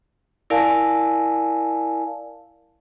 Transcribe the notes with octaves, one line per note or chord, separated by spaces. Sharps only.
E4 A#4 D5 F5 G#5 A5